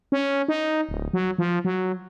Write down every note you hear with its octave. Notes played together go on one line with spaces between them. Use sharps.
C#4
D#4
D1
F#3
F3
F#3